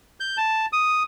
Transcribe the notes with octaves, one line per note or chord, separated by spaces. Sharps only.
G6
A5
D#6